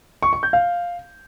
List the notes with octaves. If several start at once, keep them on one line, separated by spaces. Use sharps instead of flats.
C#6
C#6
G6
F5